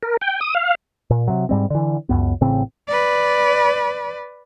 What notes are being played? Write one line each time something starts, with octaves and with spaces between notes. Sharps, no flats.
A#4
G5
D#6
F5
A#2
C3 F#3
G#2 G3 C4
D3 E3
C#2 F#2 B3
A1 A2 C#3 C4
B4 D5